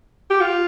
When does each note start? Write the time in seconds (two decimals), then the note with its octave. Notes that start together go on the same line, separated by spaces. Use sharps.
0.30 G4
0.41 F4